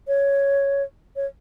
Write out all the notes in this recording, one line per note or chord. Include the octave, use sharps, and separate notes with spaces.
C#5
C#5